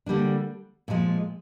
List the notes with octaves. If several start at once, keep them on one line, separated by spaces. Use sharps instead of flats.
D3 G3 A#3 D4
A#2 F3 G#3